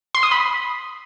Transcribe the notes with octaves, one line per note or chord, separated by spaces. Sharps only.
C6
D#6
B5